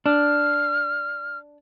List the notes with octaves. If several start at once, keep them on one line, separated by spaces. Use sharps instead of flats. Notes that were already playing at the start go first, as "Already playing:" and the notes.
D4 F6